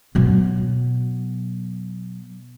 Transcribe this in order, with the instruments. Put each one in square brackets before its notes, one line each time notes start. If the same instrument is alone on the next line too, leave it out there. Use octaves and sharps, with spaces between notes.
[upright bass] B2 F#3